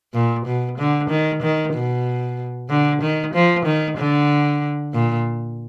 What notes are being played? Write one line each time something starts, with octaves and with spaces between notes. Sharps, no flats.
A#2
B2
D3
D#3
D#3
B2
D3
D#3
F3
D#3
D3
A#2